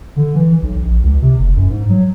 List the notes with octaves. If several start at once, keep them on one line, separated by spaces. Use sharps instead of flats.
D3
E3
B1
A#1
C#2
C3
F#1
F#2
G#2
F#3